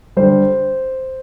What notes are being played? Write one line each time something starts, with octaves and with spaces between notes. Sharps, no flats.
D3 G3 C5